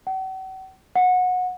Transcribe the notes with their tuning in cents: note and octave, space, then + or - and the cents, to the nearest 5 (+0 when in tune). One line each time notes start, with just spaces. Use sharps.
F#5 +45
F#5 -20